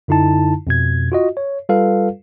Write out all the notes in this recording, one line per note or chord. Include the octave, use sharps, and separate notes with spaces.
F#2 D3 D#4 E4 A5
F2 B2 G#6
F4 F#4 D#5
C#5
G3 F4 A4 B4 F5